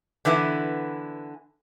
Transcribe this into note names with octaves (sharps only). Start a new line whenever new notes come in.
D3 E3 B3 E4